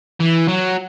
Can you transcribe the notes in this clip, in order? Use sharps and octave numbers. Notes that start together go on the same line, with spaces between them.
E3
F#3